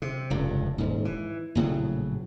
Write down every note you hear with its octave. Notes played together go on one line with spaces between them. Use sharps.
C3
F1 C#2 G2
D#1 G#2
E3
A#1 A2 C#3 F#3